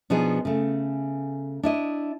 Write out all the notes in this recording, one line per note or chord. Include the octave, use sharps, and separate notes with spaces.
B2 F3 B3 D4 D#4 G#4
C#3 A3
D4 E4 D#5